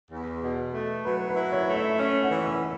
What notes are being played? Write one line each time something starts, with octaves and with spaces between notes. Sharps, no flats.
E2
B2
A3
F#3 B4
B4
E4
C#5
A3
E5
C#4 E5
F#5
E3
E6